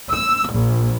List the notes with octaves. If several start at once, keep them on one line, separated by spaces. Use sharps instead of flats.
E6
A#1